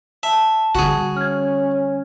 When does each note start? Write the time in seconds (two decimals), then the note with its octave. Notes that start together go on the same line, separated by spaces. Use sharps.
0.23 E5 A5
0.75 D3 G3 F#4 G#4
1.17 C#4 F6 G#6